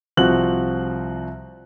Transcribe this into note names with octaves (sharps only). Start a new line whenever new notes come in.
C2 F3 C4 F#4 F#6 F#7